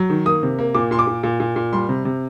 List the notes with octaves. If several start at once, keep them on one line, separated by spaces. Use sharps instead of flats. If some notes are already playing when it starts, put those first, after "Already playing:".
Already playing: F#3
D#3
A#3 D#6
C3
A#3
A#2 D6
A#2 C6
D6
A#2
A#2
A#2
A#2
G3 C6
C3
C3